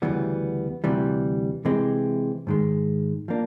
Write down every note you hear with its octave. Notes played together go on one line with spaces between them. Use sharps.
D2 C#3 E3 G3 B3
D2 C3 E3 G3
C3 E3 G#3 C4
G#2 D#3 G#3
F3 A#3 D4